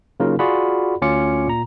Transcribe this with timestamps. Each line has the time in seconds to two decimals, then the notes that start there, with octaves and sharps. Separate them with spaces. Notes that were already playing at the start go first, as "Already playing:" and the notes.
0.20 C#3 F#3 A#3 D#4 F4 A#4
0.39 F4 F#4 G#4 D5 F#5 B5
1.02 D2 C#4 F4 D6 C#7
1.47 A#2 A#5